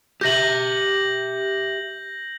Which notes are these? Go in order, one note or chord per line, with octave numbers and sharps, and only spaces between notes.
G4 E5 G6 A#6 F#7